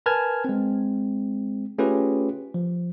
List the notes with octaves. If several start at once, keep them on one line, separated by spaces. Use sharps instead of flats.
A#4 B4 G#5 A5 F6 G#6
G#3 C4
A3 C#4 F4 G4 G#4 B4
F3